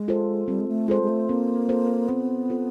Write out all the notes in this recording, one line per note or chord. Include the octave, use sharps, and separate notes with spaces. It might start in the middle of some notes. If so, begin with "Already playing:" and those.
Already playing: G#3
F4 A4 C5
G3 C4
G#3
A3
G#3 F4 A4 C5
G#3
A3
A#3 C4
F4 A4 C5
B3 C4
F4 A4 C5